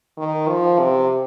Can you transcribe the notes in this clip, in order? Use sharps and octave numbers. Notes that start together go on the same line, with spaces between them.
D#3
F3
C3